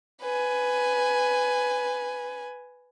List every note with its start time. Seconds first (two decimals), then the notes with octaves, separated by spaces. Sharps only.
0.21 B4 G#5